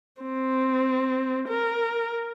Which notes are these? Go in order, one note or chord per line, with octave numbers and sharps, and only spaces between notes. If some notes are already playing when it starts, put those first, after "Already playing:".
C4
A#4